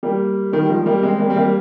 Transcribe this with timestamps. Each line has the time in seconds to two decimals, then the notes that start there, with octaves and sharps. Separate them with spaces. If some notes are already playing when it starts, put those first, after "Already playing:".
0.03 G3 A#3
0.53 D#3 G3
0.69 F3 G#3
0.86 G3 A#3
1.03 G#3 C4
1.19 G3 A#3
1.30 C4
1.36 G3 A#3